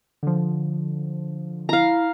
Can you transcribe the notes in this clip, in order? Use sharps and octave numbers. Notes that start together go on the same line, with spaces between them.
D3 F3
E4 F5 A#5